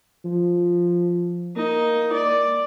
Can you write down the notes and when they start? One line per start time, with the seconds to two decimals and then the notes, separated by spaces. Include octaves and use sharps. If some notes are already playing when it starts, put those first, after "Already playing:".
0.25 F3
1.57 A#3 D#4
2.13 D5